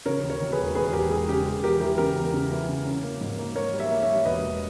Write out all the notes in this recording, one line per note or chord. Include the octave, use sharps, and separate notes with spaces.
C#3 A#4 C#5
D#2
A#4 C#5
D#2
G#4 B4
E1
E1 G#4 B4
E1 G4 A#4
E1 G#4
C#3 G4
G#3
E2 G4 A#4
E3 G4 A#4
C#3 G4 A#4
E2
C#3
E3
C#3
C#4
A#3
G#2
A#3
A#3 A#4 C#5
G3
C#5 E5
A#3
C#5 E5
G3
E1 B4 D#5
E1